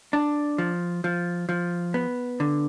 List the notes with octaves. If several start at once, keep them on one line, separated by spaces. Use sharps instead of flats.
D4
F3
F3
F3
B3
D3